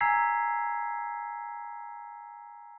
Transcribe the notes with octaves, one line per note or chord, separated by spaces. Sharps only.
G#5 A#5 E6 G#6 B6 C7